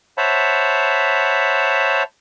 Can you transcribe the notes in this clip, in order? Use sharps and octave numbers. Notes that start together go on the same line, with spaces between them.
C5 C#5 E5 F#5 A5 B5